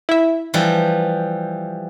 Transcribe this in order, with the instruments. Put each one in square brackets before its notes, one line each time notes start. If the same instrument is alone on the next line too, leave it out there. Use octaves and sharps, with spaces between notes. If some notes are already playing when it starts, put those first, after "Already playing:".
[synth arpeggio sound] E4 E5
[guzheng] E3 F3 G3